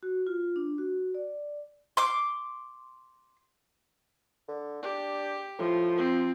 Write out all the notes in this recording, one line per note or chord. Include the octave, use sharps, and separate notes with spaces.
F#4
F4
D4
F#4
D5
C6 D6
D3
D4 G4
A2 F3
C4